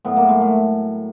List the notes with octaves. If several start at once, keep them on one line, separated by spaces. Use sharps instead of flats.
A2 F#3 B3
A#3
G#3
A3